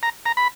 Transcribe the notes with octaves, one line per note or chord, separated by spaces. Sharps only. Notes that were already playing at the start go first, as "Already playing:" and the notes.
A#5
A#5
B5